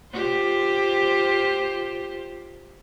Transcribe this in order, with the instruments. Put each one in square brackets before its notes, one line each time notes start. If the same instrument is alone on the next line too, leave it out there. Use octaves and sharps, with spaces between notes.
[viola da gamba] F4 G4 C5